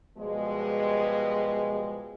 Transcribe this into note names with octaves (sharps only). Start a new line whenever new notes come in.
B2 F3 G3 G#3